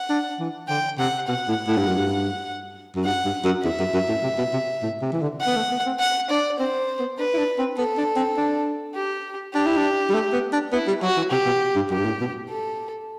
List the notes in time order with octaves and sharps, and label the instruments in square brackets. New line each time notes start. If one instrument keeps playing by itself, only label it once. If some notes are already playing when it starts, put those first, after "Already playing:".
Already playing: [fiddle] F#5
[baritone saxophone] D4
E3
[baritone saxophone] D3 [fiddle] G5
[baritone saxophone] C3 [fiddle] F#5
[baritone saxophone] B2 [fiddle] F#5
[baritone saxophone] A2
A2
G2
F#2
G2
F#2
[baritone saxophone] G2 [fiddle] F#5
[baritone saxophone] G2
F#2
[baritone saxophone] E2 [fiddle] E5
[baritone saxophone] F#2
F#2
A2
C3
B2
C3
A2
C3
E3
D3
[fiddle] F#5
[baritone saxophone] B3
A3
B3
C4
[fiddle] F#5
[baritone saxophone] D4 [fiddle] D5
[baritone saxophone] C4 [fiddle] C5
[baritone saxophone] B3
[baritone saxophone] D4 [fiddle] B4
[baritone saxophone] E4
D4
C4
[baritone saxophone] B3 [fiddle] A4
[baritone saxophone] D4
C4
D4
[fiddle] G4
[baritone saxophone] D4 [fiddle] G4
[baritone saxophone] E4
D4
G3
A3
B3
D4
[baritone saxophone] B3 [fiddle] E4
[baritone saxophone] G3
[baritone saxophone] F#3 [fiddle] F#4
[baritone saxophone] E3
[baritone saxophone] C3 [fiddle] G4
[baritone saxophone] B2
G2
[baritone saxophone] F#2 [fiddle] G4
[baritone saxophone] G2
A2
B2
[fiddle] A4